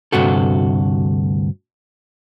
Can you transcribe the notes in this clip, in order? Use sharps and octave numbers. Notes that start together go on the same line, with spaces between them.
D2 G2 C3 F#4 A4